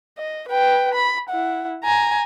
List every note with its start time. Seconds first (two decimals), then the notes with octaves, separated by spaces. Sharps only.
0.18 D#5
0.49 B4 G5
0.95 B5
1.29 E4 F#5
1.84 G#5 A#5